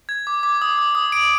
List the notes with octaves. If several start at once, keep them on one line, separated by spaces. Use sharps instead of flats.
G#6
D6
D6
D#6
D#6
D#6
D7